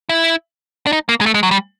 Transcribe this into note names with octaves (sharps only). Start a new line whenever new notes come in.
E4
D4
D#4
A#3
G#3
A3
G#3
F#3
G3